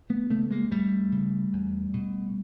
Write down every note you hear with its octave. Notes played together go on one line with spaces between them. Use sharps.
A3 B3
C#3 A3 B3
G#3 A#3
F2 G3 A3
C#3
E2
B2